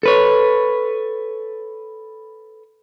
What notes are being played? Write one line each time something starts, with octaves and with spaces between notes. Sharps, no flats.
A4 B4 C#5